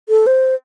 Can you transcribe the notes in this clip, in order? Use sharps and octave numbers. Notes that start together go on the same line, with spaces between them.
A4
C5